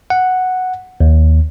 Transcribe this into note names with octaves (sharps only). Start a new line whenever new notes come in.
F#5
D#2